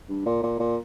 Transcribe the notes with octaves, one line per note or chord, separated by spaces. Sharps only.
G2
A#2
A#2
A#2